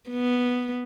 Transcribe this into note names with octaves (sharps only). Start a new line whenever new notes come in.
B3